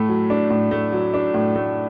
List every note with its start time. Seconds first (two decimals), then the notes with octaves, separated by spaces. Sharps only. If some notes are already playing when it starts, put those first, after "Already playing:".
Already playing: A2 A3
0.08 F#3
0.30 D4
0.50 A2
0.71 A3
0.92 F#3
1.14 D4
1.34 A2
1.56 A3